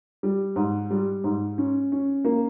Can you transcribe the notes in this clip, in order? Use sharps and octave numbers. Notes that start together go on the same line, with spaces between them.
G3
G#2
G3
G#2
C#4
C#4
A#3